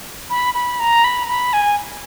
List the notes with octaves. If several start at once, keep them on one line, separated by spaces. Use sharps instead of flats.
B5
B5
A#5
B5
B5
G#5